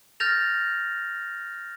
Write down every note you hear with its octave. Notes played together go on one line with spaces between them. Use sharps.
F6 G6 A6 A#6 F7